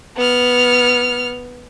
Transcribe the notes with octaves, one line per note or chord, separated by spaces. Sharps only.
B3 F6